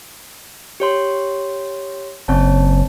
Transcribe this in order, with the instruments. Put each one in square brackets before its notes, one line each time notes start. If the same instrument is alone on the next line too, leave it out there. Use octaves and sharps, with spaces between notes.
[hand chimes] G4 C#5 C6
[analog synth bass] F#1 [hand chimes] C4 C#5 A5